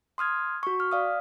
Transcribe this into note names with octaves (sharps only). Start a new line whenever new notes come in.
C6 D#6 F6 G#6
F#4 C#6
F6
D5 F5 D#6